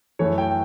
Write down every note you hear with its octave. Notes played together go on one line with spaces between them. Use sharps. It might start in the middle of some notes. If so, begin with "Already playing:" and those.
F#2 E3 A3 C#5
G5